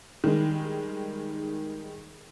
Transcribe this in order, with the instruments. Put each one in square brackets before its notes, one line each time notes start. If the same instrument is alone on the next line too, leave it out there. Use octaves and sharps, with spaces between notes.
[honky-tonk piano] D#3 G3 G#3